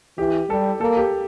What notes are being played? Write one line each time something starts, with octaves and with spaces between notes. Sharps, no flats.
E3 G4
G3 A4
A#3 A4
G4